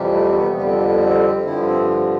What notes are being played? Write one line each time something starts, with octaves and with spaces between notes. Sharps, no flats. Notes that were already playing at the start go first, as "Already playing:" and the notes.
Already playing: F2 C3 E3 G3
A3
C4
B3
F2 D3 G3 B3
C4
B3
B3
C4
G2 D3 F3 E4
C4